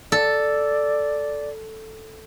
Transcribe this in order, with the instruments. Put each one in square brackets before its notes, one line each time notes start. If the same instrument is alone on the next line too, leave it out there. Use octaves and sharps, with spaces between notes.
[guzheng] A4 [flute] D5